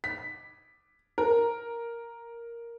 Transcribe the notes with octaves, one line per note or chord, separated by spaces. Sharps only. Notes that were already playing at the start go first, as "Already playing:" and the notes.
B6
A#4